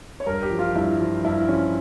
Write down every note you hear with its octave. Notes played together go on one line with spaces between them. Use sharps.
C#5
G2 A#4
G4
F3
F4
G2 E4
F3
G2 E4
F3 C#4